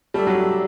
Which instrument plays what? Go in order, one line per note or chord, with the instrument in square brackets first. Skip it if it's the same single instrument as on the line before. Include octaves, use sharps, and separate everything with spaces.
[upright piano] G3 [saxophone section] A3 D4 A4
[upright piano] F#3